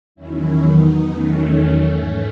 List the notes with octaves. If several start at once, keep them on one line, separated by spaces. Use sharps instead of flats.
E2 D#3 F#3 C#4 E4
B3 D#4
E2 D#3 F#3 A3 C#4
G#2 E3